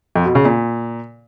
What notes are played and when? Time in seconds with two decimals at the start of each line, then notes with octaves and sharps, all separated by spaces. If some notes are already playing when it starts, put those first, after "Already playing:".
0.15 F2
0.25 B2
0.35 C#3
0.45 A#2